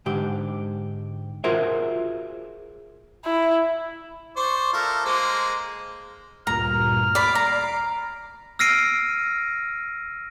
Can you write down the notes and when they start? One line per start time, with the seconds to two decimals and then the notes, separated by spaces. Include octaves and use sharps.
0.06 G#2 D3 G4
1.44 F4 F#4 G#4 A#4 C5 E5
3.25 E4
4.36 C5 D5 C#6
4.73 A3 F4 A#4
5.05 G#3 A#3 C5
6.47 D2 G2 A#2 A#5 F6
7.15 D5 B5 C7 D7
7.35 A#5
8.59 E6 F6 A#6 C7 D7 D#7